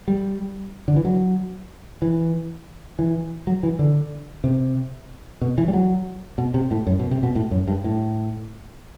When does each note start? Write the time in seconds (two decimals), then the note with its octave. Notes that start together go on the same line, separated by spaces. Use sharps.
0.08 G3
0.88 D3
0.96 E3
1.05 F#3
2.02 E3
2.99 E3
3.47 F#3
3.63 E3
3.79 D3
4.44 C3
5.41 B2
5.58 E3
5.68 G3
5.73 F#3
6.38 B2
6.54 C3
6.71 A2
6.87 F#2
6.99 B2
7.11 C3
7.23 B2
7.35 A2
7.51 F#2
7.68 G2
7.84 A2